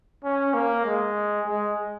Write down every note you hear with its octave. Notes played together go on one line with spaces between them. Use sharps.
C#4
A#3
G#3
G#3